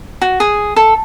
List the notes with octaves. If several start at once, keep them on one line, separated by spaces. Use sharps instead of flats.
F#4
G#4
A4